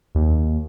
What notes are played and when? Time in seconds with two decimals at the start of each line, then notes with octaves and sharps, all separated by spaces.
0.15 D#2